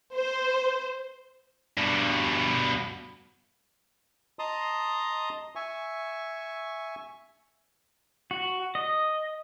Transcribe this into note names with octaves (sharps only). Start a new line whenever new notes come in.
C5
G2 B2
D#5 A5 A#5 C6 D#6
E5 G#5 C#6
F#4
D#5